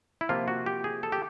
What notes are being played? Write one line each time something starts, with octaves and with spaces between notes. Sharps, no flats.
E4
C3 F3 A#3 F4
F#4
G4
G#4
A4
G4